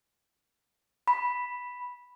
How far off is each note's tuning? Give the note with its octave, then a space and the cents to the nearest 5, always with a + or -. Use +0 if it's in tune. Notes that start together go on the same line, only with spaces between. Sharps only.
B5 -5